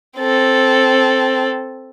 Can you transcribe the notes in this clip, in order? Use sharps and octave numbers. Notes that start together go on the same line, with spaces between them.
C4 A4